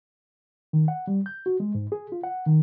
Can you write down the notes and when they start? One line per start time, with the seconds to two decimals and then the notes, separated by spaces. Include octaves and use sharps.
0.73 D#3
0.88 F#5
1.07 G3
1.26 G6
1.46 F#4
1.60 G#3
1.75 G#2
1.92 G#4
2.12 F4
2.23 F#5
2.46 D#3